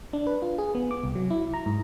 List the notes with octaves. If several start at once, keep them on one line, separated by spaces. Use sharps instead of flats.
D4
B4
F4
G#4
B3
D6
C2
F#3
E4
A#5
G#2